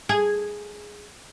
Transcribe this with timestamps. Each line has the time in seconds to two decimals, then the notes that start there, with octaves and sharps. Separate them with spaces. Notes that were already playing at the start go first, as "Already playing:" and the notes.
0.09 G#4